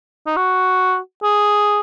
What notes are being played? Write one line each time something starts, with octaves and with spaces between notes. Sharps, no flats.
D#4
F#4
G#4